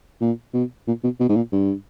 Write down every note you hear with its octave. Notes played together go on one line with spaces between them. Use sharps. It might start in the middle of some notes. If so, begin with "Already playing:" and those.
A#2
B2
A#2
B2
B2
G#2
A#2
G2